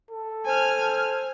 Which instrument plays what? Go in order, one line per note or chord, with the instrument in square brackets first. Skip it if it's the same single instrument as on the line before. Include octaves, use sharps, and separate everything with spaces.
[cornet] A4
[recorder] C5 [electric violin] G#5 F6